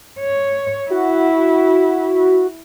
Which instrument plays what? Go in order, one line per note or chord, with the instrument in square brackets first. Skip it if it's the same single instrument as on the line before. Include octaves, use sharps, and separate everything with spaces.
[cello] C#5
[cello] E4 [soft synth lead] F#4